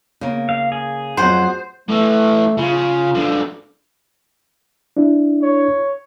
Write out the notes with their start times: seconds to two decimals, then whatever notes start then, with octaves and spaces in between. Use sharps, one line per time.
0.21 C#3 A#3
0.49 F5
0.72 G#4
1.17 F2 F#3 C5 F#5
1.89 A2 E3 A3
2.57 C#3 F4
3.15 D3 F3
4.97 D4 E4
5.42 C#5